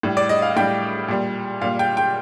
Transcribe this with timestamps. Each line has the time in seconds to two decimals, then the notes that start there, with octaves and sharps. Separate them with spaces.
0.03 A2 G3
0.17 D5
0.29 D#5
0.42 F5
0.56 A2 G3 G5
1.08 A#2 G3
1.61 A#2 F5
1.64 G3
1.79 G5
1.97 G5